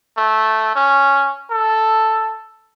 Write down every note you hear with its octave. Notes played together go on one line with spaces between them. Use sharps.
A3
C#4
A4